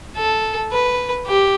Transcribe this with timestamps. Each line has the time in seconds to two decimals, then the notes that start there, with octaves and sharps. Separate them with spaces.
0.17 A4
0.72 B4
1.27 G4